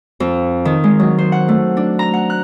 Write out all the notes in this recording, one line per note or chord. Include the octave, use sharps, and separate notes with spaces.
F2
D#3
G#3
F#3
C5
F#5
A3
D4
A#5
F#5
F#6